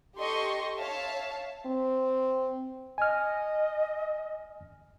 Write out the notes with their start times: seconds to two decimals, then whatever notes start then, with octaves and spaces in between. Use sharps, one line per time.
0.16 G4 A4 D#5 C6 C#6
0.79 C#5 E5 F5 A5
1.66 C4
2.98 D#5 G#5 F6